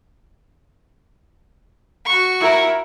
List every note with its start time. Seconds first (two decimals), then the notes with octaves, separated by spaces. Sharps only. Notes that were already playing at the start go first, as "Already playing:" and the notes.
2.05 F#4 C#6
2.41 E4 A#4